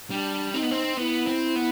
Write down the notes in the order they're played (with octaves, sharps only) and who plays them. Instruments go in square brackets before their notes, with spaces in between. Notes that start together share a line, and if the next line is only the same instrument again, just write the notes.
[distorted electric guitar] G3 [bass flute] D4
[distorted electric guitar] C4 [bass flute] D#4
[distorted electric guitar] B3
C4
[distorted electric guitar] B3 [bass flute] E4
[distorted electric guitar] C4
B3